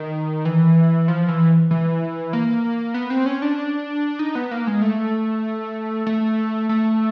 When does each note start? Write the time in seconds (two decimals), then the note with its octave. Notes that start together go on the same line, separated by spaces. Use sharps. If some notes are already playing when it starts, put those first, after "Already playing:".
Already playing: D#3
0.45 E3
1.08 F3
1.28 E3
1.71 E3
2.33 A#3
2.94 B3
3.10 C4
3.26 C#4
3.42 D4
4.19 D#4
4.35 B3
4.51 A#3
4.67 G#3
4.82 A3
6.06 A3
6.69 A3